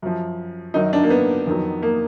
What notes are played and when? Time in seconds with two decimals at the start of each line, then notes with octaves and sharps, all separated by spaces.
0.02 F#2 F3
0.74 F#2 D#3 F#3 D#4
0.93 D4
1.04 A#3
1.10 B3
1.47 F2 D#3 F#3
1.83 A#3